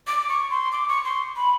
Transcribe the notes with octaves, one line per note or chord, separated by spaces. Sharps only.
D6
C#6
C6
D6
C#6
C6
B5